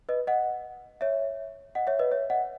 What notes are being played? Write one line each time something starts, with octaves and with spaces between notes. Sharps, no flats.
B4 D#5
D#5 F#5
C#5 E5
D#5 F#5
C#5 E5
B4 D#5
C#5 E5
D#5 F#5